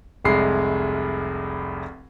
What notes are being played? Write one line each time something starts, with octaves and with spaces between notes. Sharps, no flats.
F1 C2 G#3 C7